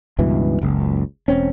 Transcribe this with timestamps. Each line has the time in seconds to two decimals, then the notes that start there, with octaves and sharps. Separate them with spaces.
0.19 C#2 G2 B2 E3
0.61 F#1 C#2
1.28 E1 C4 C#4